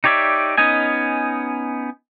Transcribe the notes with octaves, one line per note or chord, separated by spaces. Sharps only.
D#4 G4 C#5 D5 E5
B3 C#4 D#4 D#5 G#5